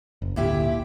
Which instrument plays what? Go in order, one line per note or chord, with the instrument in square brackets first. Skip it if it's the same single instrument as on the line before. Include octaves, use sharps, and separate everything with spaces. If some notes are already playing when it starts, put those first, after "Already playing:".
[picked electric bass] F#1
[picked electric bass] G#1 D2 [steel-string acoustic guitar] A#2 E4 G4